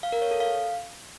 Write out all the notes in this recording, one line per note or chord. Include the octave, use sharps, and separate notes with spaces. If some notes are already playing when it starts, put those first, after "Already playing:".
F5
A#4
C#5
A4
F5